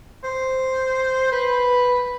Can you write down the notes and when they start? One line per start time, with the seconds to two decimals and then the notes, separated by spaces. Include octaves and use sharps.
0.24 C5
1.32 B4